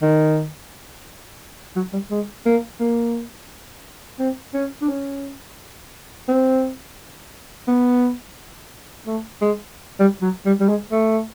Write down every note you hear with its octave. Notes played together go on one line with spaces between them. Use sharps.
D#3
F#3
G3
G#3
A#3
A#3
C4
C#4
D4
C#4
C4
B3
A3
G#3
G3
F#3
G3
G3
G#3
A3